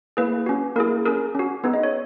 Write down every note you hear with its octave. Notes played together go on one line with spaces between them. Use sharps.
A#3 E4 G#4 B4
C#4 F#4
A#3 E4 G#4 A#4
C#4 G#4 A#4
C#4 F#4
B3 D#4 G#4 B4
D#5
C#5